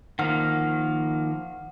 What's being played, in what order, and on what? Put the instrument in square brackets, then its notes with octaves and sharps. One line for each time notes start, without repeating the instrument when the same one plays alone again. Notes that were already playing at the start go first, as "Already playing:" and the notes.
[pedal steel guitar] D#3 F3 A#3 [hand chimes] F#5 F6